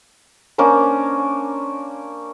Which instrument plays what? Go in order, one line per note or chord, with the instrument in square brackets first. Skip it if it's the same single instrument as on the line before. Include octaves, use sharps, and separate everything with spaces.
[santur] A#3 C#4 D4 C5